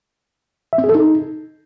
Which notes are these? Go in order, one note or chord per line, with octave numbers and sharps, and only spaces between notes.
E5
C4
G#4
A4
D#4